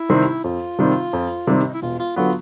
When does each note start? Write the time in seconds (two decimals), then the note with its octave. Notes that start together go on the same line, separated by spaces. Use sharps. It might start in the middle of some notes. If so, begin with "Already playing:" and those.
Already playing: E4
0.09 C3 D#3 G3 C4
0.44 F2 F4
0.79 C3 D#3 G3 C4
1.13 F2
1.47 C3 D#3 G3 C4
1.58 D4
1.66 D#4
1.74 E4
1.82 E1 F4
1.99 F4
2.16 D3 F#3 B3 F4